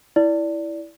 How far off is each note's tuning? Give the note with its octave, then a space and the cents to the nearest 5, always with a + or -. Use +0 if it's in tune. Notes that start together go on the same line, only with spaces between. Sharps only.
E4 +0 D5 -15